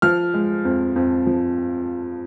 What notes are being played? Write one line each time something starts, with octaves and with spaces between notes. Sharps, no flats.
F3 F6
G#3
F2
F2
F3